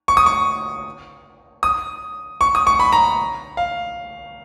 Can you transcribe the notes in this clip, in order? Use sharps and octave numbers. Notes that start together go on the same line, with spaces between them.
C#6
D#6
C#6
D#6
C#6
D#6
C#6
B5
A#5
F5